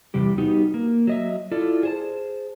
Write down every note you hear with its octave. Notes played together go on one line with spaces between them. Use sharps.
E2 C3 G3 G4
G3 B3 D#4 F#4 G4
A#3
F#3 D#5 E5
E4 F4 A4 D5
G#4 C5 A5